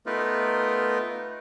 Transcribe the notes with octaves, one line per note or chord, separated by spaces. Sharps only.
A3 B3 D#4 F4 A#4 B4